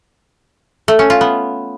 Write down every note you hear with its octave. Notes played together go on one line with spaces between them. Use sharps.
A3
C#4
F4
B3